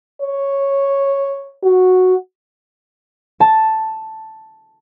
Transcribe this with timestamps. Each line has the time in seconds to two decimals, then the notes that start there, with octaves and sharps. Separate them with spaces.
0.22 C#5
1.64 F#4
3.40 A5